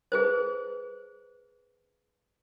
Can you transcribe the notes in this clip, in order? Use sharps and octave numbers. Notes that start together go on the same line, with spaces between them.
G#4 B4 C5